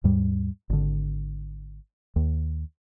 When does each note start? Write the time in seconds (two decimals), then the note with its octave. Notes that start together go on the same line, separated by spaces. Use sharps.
0.04 D#2 G#2 G3
0.70 G#1 D3
2.16 D#2